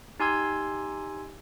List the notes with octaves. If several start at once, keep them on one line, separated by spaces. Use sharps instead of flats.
D#4 G4 G#5 C6 E6 G#6